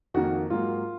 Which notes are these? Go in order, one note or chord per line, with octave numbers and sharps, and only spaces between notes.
F2 D#3 A#3 F#4
G#2 F#3 A#3 F4